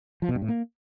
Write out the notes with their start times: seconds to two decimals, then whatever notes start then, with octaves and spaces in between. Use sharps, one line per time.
0.22 F3
0.29 B2
0.35 G2
0.42 A2
0.48 A#3